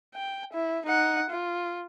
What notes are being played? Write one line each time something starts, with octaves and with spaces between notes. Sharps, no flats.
G5
E4
D#4 F#5
F4